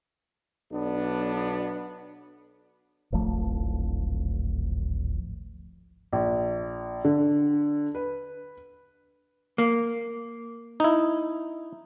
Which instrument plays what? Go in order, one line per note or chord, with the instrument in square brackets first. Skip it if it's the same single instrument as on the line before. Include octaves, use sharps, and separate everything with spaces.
[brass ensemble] B1 B3 D4
[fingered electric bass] D1 G#1 F3 A3
[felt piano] A#1
D3
B4
[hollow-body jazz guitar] A#3
[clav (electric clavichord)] D#4 E4